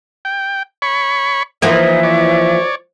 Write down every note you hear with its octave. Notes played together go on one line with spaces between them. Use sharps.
G5
C#5 B5 C#6
E3 F3 A#3 D#4 E5
C#5 D5